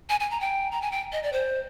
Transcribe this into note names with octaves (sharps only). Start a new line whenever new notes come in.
G#5
G#5
A#5
G5
A#5
G#5
G5
D#5
D5
C5